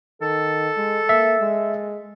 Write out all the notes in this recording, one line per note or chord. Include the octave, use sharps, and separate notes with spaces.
D#3 A4
G#3
A#3 E5
G#3